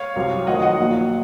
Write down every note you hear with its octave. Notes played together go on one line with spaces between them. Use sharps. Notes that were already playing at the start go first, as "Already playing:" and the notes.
Already playing: C#5 F5
C2 C3 F#3
F1 F2 D#3 F#3 D#5 F#5
D#5 F#5
A#1 A#2 F#3